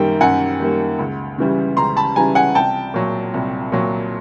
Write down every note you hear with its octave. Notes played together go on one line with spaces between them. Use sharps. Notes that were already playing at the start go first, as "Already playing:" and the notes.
Already playing: F#2 D#3 G3 A#3 G5
F#2 F#5 G#5
D#3 G3 A#3
C#2
C#3 E3 G3
C#2 A#5 C6
A5 B5
C#3 E3 G3 G#5 A#5
F#5 G#5
C2 G5 A5
A#2 F#3
C2
A#2 F#3